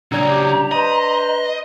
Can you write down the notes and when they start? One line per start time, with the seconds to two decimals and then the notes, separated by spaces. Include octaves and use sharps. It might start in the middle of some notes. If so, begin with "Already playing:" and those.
0.12 C#3 F#3 D4 D5 A#5 G#6
0.26 G4
0.71 B4 C5 D#5